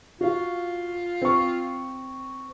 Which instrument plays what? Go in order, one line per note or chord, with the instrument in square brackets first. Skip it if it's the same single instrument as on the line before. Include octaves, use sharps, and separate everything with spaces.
[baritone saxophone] F4 [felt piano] F#4 F5
[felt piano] C4 C#6